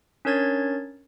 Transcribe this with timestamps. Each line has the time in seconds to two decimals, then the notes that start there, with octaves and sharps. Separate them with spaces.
0.25 C#4 D4 A#4 C#5 G#6 A6